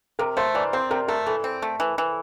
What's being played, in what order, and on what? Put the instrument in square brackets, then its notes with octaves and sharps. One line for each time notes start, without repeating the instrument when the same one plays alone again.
[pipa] C3 [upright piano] A#4
[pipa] A3 [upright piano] C5
[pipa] E3 [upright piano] D5
[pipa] C4 [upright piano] C5
[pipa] C3 [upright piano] A#4
[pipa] A3 [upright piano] A#4
[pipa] E3 [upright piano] A4
[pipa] C4
A3
E3
E3